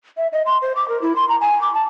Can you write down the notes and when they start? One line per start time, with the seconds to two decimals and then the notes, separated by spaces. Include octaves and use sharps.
0.17 E5
0.33 D#5
0.46 C6
0.62 C5
0.76 D6
0.88 A#4
1.02 E4
1.16 C6
1.29 A#5
1.41 G#5
1.61 D6
1.74 A5